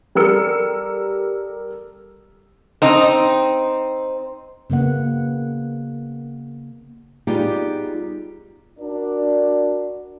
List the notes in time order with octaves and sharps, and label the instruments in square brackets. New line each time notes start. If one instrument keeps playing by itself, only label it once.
[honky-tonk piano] G3 A4 A#4 E6 C#7
[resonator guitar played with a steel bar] C4 D#4
[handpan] C#3 A#3 B3 F#5
[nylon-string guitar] G3 B3 D#4 F4 G4 G#4
[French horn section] D4 F#4 A#4 D5